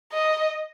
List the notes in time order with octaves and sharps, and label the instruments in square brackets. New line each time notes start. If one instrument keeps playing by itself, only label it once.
[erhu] D#5